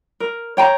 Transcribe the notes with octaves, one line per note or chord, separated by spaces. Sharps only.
A#4
C#5 G5 A#5